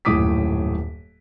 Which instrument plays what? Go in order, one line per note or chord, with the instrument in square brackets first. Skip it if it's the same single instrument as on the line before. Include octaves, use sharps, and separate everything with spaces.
[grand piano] D#1 F#2 A2 D6 D#6 B6